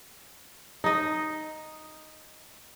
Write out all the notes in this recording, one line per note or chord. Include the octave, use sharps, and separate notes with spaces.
D#4 D#5